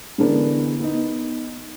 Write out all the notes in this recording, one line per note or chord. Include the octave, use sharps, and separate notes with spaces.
D3 E3 G#3 B3 D4 A#4
B3 D#4